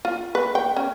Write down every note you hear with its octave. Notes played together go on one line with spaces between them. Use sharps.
F4
B4
G5
C#4